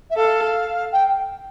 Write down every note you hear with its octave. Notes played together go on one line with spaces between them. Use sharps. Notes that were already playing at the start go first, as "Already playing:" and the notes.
E5
A4 F5
G5